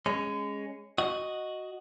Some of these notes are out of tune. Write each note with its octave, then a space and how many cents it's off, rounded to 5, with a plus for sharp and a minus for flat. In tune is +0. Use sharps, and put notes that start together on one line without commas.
G#3 +0 C#4 +0 C6 -45
F#4 +0 D#5 +0